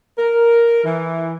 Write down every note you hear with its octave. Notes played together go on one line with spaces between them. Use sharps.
A#4
E3